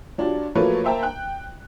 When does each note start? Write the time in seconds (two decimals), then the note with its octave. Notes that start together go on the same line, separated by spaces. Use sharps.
0.18 F#3 D4 F4 G4
0.55 F3 F#3 A3 A#3 B4 C#5
0.84 A#3 C5 E5 G5 A5 A#5
1.03 G5 F#6